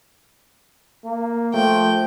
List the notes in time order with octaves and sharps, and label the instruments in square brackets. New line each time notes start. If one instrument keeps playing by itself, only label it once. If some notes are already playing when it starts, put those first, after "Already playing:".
[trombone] A#3
[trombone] F3 [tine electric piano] A3 [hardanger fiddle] G5